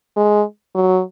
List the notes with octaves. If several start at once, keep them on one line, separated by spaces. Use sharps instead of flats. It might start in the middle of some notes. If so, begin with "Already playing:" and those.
G#3
F#3